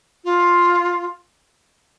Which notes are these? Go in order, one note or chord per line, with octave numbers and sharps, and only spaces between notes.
F4